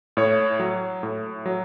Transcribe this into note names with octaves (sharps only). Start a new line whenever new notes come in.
A2 C#5
F#3
A2
F#3